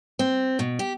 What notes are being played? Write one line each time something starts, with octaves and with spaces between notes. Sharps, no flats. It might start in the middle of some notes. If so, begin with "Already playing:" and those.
C4
B2
G4